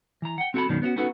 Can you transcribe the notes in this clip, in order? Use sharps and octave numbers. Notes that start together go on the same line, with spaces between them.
E3 A#5
F#5 G5
C4 F#4 A4 F#5 A5 B5
F#2 B2 D#3 G#3 C#4 D4
B3 C#4 F4 F#4
B3 C#4 D#4 F#4 A4 B4